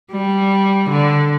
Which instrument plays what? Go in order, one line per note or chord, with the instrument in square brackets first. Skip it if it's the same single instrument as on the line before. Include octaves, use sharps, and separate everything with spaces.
[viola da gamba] G3
D3